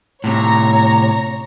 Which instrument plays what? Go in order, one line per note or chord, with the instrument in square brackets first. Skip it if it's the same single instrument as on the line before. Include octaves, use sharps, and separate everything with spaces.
[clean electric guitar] A2 C3 [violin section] C#5 A#5